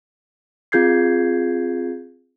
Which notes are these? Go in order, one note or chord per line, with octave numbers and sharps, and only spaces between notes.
C4 F4 G#4 G6 G#6 C7